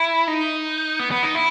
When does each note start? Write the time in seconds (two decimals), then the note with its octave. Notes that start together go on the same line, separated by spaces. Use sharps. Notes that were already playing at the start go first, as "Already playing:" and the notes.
Already playing: E4
0.28 D#4
0.99 B3
1.12 B3
1.23 D#4
1.35 E4